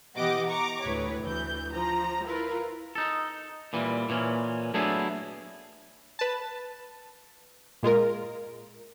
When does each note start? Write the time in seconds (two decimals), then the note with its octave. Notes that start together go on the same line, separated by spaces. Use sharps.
0.16 B2 E3 G4 D#5 F#5 D6
0.48 A#5 C#6 D6
0.82 D2 A2 B4 C#5
1.23 D2 E3 G6
1.73 F3 A#5
2.25 E4 F4 A#4 B4
2.95 D#4 A4
3.73 A#2 E3 G3
4.09 A#2 E3 C#4
4.74 F#3 A3 B3 D4 E4 G#4
6.19 B4 A5
7.83 A#2 G#3 F4 A#4